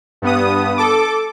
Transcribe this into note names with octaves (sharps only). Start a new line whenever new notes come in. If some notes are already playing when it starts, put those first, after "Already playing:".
G2 B3 D#6
A4 D6